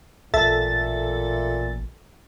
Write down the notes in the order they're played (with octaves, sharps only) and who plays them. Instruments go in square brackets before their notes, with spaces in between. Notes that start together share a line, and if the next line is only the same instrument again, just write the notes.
[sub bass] A1 [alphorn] A#2 [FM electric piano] A4 [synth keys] E5 A6